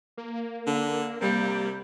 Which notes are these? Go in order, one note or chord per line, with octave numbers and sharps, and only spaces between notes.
A#3
D3
C3 G3 A#3